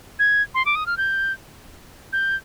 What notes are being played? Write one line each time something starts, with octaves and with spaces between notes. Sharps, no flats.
G#6
C6
D6
D#6
F6
G6
G6